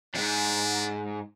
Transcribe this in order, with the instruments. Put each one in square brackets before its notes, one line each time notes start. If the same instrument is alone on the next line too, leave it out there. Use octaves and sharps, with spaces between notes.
[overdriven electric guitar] E2 G#2 [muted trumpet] D4